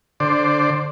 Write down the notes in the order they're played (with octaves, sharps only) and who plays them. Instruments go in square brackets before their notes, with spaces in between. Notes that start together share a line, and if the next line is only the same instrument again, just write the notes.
[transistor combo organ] D3 C5 D5